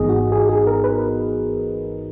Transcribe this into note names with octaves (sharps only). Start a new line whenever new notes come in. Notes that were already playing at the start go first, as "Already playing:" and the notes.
Already playing: G#1 G#2 E3 B3 D#4 G#4 D#5
F#4
G#4
G#4
A#4
B4